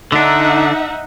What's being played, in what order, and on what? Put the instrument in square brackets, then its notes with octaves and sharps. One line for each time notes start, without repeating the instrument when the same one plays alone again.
[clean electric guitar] D3 D4 [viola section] D#4 E5 F#5